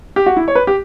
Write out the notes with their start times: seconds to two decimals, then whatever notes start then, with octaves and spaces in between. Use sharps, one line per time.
0.16 G4
0.26 F#4
0.36 E4
0.48 C#5
0.55 B4
0.67 G4